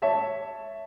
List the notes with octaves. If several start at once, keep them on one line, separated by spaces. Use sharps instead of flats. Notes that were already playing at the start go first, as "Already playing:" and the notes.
C#5 E5 A5